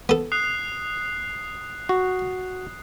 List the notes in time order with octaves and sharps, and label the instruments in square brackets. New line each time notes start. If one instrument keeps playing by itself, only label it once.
[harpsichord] B3 A4
[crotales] D#6 F#6 C7
[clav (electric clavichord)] F#4